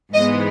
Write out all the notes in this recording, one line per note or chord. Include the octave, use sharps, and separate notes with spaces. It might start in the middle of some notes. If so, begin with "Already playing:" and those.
G#2 E3 G#3 B3 D#5